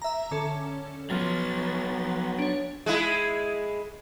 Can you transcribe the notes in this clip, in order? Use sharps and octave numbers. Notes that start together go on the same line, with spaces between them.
E5 A#5
D3 C#4 A4
F3 F#3 B3 A6
D4 C#5
G#3 E4